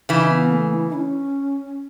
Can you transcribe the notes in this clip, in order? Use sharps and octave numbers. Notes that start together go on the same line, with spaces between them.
C#3 E3 D#4
B3
A3
E4
C#4